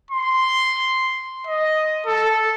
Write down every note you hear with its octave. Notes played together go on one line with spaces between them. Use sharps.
C6
D#5
A4